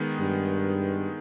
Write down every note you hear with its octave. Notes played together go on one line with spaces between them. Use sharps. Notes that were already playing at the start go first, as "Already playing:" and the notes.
Already playing: D#3 G#3 B3
G2